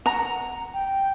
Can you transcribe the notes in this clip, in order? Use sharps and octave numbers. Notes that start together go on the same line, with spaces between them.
F#5 A#5
G5